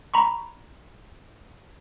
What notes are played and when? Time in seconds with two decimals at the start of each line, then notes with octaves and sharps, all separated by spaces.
0.14 A#5 B5 C#6